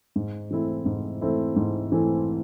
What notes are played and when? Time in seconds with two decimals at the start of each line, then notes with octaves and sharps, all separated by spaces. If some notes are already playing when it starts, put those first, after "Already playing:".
0.16 G#2
0.51 E3 A3 C4 E4
0.86 G#2
1.21 E3 A3 C4 E4
1.56 G#2
1.92 E3 A3 C4 E4